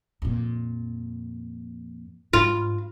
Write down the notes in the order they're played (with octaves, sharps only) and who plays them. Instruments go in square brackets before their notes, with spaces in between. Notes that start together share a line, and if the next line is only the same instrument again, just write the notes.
[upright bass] F2 A#2
[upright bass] G#2 [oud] F4